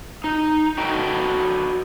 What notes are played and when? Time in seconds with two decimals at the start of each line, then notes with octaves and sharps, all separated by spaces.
0.24 D#4
0.78 F#4 A4 B4 D#5 G5